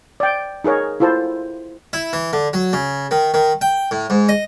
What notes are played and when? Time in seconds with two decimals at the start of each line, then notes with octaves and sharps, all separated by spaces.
0.20 D5 G5
0.64 D#4 G#4 A#4 C#5
1.00 E4 F4 A4 C5 A5
1.93 E4
2.13 E3
2.33 D3
2.53 F#3
2.73 C#3
3.11 D#3
3.34 D#3
3.61 G5
3.91 A2
4.10 G#2
4.29 D#5